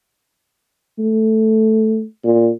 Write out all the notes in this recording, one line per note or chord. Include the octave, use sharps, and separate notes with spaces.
A3
A#2